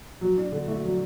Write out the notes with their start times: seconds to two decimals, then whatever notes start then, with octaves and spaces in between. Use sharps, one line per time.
0.21 F#3
0.37 D4
0.52 D3
0.68 A3
0.85 F#3